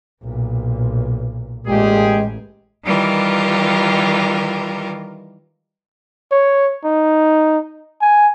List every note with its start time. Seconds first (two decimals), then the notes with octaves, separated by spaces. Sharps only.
0.23 B1 A#2
1.66 A1 A#2 G#3 G4 G#4
2.84 D#3 E3 G3 F4 G4 A#4
6.32 C#5
6.85 D#4
8.01 G#5